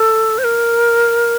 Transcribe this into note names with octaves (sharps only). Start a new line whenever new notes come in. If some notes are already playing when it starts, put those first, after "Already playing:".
Already playing: A4
C5
A#4